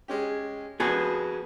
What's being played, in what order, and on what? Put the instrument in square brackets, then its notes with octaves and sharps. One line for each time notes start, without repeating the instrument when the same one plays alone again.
[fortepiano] G#3 C#4 G4
[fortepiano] F2 B4 F#6 [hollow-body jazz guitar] B3 F#4 G#4